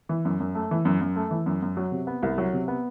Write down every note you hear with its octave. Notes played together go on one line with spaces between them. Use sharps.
E3
F#2
F#2
A3
E3
F#2
F#2
A3
E3
F#2
F#2
F#3
C3
B3
C2
F#3
C3
B3